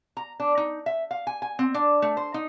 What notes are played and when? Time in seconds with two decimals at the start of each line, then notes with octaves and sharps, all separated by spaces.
0.17 A#5
0.40 D4
0.57 D#4
0.86 E5
1.11 F5
1.27 G#5
1.42 G#5
1.59 C4
1.74 D4
2.02 A3
2.17 C5
2.34 D#4